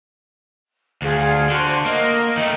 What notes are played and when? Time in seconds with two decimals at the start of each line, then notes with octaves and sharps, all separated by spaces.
1.02 D2 F4 G#4
1.49 D3 F#4 C5
1.86 A#3 D#5
2.37 D#3 A3